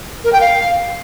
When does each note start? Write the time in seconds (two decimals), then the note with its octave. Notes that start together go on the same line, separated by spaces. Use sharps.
0.24 A#4
0.33 G5
0.41 F5